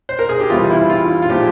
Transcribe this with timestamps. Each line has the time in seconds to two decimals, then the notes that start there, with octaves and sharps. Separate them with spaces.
0.09 C5
0.19 A#4
0.29 G#4
0.40 G4
0.50 E2 C3 G3 F4
0.70 E4
0.90 F4
1.22 F4
1.30 A#2 F3 G#3 G4